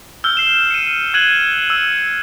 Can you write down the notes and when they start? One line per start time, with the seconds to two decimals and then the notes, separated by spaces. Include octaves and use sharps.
0.24 E6 F6 G6 G7
0.37 C7 E7
0.71 C#7 D#7
1.14 E6 F#6 G#6 D#7 F#7
1.70 E6 C#7